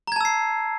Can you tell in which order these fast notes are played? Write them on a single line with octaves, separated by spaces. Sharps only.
A#5 G#6 A5 E6 C7